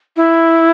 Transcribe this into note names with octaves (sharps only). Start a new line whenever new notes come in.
E4